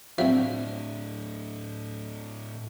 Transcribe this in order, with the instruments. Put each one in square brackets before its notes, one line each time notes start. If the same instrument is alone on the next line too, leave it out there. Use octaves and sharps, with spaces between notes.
[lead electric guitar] A2 D4 [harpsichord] F3 F#3 C4 [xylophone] E5